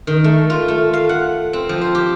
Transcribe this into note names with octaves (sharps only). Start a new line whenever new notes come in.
D#3
A3
F4
A3
F5
F#5
C4
F3
C5
G4